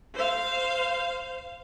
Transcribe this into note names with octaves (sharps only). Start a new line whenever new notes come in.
C5 F5